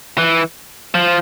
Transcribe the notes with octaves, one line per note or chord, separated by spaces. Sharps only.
E3
F3